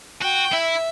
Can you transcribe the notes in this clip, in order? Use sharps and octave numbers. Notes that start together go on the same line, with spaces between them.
F#4 G5
E4 E5